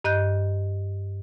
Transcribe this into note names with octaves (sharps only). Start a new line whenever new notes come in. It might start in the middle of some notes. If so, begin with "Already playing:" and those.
G2 D#5 F#6 G6